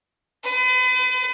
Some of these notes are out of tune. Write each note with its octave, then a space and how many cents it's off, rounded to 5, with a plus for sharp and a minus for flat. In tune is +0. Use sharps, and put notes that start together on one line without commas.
B4 +40